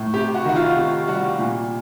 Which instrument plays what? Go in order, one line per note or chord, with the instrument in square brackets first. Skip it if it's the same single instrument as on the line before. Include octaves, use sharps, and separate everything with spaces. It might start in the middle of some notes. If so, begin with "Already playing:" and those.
Already playing: [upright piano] A2
C3 G4
F#4
D#3 F#4
F4
C3
G3 F#4
A#2